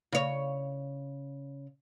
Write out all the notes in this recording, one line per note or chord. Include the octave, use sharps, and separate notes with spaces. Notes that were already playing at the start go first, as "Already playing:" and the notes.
C#3 C#5